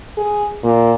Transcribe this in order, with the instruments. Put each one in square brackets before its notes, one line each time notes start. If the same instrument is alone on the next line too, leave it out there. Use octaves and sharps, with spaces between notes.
[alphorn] G#4
A#2